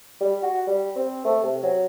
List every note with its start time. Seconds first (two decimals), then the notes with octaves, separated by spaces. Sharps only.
0.20 G3
0.42 F#4
0.67 G3
0.96 C4
1.25 A3
1.43 C3
1.63 F#3